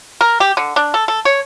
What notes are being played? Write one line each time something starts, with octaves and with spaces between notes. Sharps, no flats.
A#4
G4
D3
D4
A4
A4
C#5